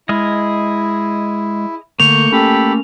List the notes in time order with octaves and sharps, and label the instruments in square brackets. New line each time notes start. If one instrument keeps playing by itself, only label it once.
[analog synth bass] G#3 [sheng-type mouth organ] E4 [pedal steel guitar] G#4 D#5 F6
[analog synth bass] D3 [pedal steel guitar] A3 A#3 [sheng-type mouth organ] C#6 G6 [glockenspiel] F7
[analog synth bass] C#4 [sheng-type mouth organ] G4 A4 B5